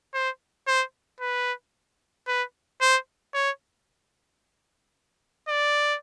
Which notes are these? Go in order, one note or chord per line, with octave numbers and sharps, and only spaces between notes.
C5
C5
B4
B4
C5
C#5
D5